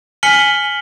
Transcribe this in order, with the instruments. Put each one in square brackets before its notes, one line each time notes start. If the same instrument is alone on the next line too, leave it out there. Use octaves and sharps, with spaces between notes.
[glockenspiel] G#5 F6 B6 C#7 F#7 G7